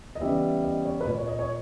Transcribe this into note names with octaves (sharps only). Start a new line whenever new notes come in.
D#5
C#3 E3 G3 B3 E5
D#5
C#5
B4
A#2 A#3 C#5
C#5
D#5
C#5